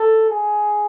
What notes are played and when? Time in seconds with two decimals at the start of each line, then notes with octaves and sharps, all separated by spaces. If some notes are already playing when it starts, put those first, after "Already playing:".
Already playing: A4
0.30 G#4